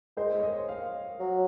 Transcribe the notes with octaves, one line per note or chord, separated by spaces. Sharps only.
G#3 C5
C#5
D#5
F5
F#3